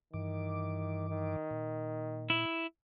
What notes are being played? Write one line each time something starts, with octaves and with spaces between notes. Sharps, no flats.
G2 D#3 E3 D6
D#3
A#2
E4